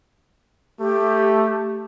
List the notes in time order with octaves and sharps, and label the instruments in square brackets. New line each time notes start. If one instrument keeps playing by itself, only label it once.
[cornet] A3 [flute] G4